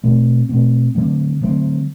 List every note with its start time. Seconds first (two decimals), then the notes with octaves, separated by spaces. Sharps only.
0.04 B2 A3 C4
0.49 B2 A3 C4
0.95 D3 F#3 A3 C4
1.41 D3 F#3 A3 C4